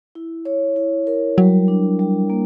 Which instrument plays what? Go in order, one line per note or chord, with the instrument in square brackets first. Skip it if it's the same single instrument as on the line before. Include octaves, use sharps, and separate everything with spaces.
[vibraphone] E4
C#5
E4
A#4
[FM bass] F#3 [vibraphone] G3
[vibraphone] D4
G3
A#3